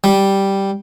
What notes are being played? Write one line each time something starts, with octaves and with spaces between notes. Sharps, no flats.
G3